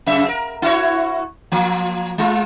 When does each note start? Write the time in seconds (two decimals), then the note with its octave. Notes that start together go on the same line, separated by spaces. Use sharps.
0.06 F#2 C#3 E5
0.28 A#4
0.62 E4 F#4 C#5
1.52 F3 A#3
2.18 G#3 F4